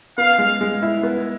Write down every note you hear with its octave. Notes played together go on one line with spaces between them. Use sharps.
B3 F5
G#3
G#3
E4
B3